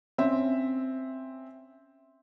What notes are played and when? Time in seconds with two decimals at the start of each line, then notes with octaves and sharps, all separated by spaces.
0.18 C4 C#4 E5